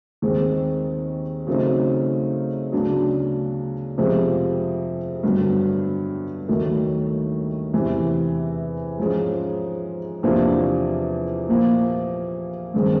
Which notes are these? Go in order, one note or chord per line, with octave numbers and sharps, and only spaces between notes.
D#2 D#3 G#3 C4
C#3 F#3 A3 C4 D#4
D2 C#3 F#3 B3 D4
F2 C3 F3 G#3
G2 D3 F#3 B3
D#2 D#3 F#3 A3
E2 C3 E3
G#2 F3 G#3 C#4
E2 C3 F3 A#3 D4
A#2 F3 A#3
G2 D#3 G#3 C4